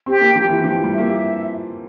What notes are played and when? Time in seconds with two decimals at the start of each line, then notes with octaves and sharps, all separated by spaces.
0.06 C4 G4
0.21 A#3
0.36 F3 G4
0.49 E3
0.64 F3 G4
0.84 G3
0.93 A#3 E5